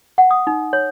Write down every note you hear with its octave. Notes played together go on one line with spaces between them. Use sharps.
F#5
D#6
D#4
C#5